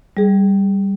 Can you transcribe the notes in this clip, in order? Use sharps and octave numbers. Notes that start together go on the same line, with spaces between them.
G3 G#4